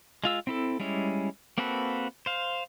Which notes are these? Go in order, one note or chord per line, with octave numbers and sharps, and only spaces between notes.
G#3 F4 E6
C4 E4 A4
G3 G#3 C#4 E4
A#3 C4 F#4 A4 B4
C5 F5